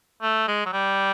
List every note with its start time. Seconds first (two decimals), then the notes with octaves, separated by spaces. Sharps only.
0.22 A3
0.48 G#3
0.66 F#3
0.73 G3